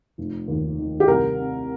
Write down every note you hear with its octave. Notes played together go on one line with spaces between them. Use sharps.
F1
D#2
D#3
G4
C2 A#4
C3